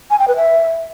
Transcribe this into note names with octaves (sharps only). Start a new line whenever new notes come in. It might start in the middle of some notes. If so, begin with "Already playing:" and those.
G#5
G5
B4
E5